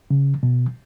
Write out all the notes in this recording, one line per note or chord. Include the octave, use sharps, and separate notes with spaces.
C#3
B2